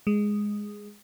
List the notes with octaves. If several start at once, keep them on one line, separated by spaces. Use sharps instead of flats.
G#3